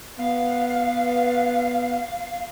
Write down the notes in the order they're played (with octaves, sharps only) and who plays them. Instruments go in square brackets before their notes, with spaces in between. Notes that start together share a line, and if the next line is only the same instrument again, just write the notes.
[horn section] B3 [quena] F5